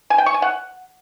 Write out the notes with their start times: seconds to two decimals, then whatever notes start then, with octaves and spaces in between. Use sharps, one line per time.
0.10 G#5
0.18 G5
0.26 C#6
0.34 G#5
0.42 F#5